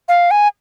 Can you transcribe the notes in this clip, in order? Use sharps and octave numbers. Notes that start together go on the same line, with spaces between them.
F5
G#5